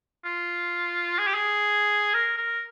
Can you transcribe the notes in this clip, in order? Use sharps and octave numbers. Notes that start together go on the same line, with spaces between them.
F4
G#4
G4
G#4
A#4
A#4